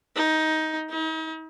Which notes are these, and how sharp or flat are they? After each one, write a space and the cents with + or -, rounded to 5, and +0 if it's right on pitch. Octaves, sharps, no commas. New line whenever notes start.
D#4 +15
D#4 +45